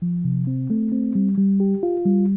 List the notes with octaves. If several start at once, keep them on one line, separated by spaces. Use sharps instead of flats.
F3
C3
C4
A3
C4
G3
G3
G4
F4
G3